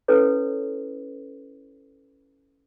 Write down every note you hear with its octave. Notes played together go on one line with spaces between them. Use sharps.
C#4 E4 A4 B4 C#5